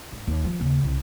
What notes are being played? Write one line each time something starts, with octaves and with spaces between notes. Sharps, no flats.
G#2
D#2
F3
D#2 C#3
C2